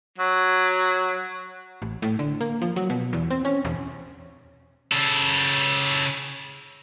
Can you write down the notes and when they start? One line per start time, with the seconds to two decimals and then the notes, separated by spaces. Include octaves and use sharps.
0.18 F#3
1.82 A1
2.02 A2
2.19 D3
2.41 A#3
2.62 F3
2.76 F#3
2.90 B2
3.13 E2
3.31 C4
3.45 C#4
3.65 E1
4.92 C#3 A4